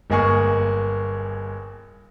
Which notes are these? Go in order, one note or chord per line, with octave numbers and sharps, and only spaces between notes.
G1 G#3 A#3 G#4 C#6